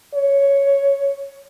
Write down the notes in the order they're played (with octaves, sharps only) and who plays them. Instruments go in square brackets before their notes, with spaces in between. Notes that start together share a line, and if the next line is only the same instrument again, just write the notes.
[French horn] C#5